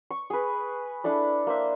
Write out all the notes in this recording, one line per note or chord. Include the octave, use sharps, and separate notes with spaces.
C#6
G#4 B4
D4 E4 A4 D5
A#3 C5 E5